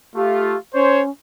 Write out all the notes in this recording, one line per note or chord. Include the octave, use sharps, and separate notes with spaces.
A3 F4 G4
C#4 C5 C#5